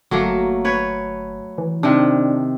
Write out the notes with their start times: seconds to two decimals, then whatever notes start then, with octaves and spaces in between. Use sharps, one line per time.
0.11 G1 F#3 A3 A#3
0.65 B4 C#5
1.58 E3
1.83 C3 D#3 D4